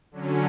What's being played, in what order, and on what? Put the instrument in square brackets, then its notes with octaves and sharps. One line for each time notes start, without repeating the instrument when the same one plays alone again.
[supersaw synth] D3 F#3 C#4